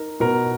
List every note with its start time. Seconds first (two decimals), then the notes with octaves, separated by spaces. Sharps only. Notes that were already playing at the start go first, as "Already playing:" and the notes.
Already playing: D#4 A#4
0.20 B2 A#4